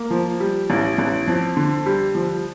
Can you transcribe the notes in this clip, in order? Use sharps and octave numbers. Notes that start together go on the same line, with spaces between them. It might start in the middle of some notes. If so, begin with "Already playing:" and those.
Already playing: A#3
F3
G3
A1
A1
F2
D3
G3
F3